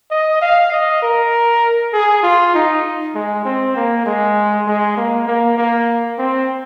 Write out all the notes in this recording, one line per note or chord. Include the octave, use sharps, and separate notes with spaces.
D#5
F5
D#5
A#4
G#4
F4
D#4
G#3
C4
A#3
G#3
G#3
A#3
A#3
A#3
C4